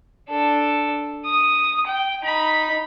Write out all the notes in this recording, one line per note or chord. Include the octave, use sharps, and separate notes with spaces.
D4 A4
D#6
G5
D#4 B5